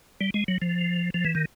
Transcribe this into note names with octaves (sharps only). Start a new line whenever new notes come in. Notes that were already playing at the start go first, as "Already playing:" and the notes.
G3
G#3
F#3
F3
F3
E3
D#3